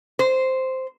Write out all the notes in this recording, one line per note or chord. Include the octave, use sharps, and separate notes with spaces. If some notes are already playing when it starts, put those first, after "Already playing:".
C5